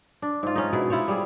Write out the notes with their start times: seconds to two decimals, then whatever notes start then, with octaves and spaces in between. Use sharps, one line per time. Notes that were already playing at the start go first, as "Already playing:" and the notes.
0.22 D4
0.43 G#2 F4
0.56 C#4 D#4
0.73 B2 E4 G#4
0.90 E4 F4 C5 C#5
1.08 G3 G#4